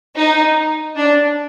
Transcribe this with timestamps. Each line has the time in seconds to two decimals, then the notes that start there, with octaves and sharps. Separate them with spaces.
0.17 D#4
0.96 D4